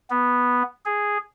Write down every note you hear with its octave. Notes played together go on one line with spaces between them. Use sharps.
B3
G#4